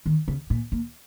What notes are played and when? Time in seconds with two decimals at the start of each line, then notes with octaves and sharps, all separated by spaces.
0.06 D#3
0.28 C#3
0.50 A#2
0.72 A#2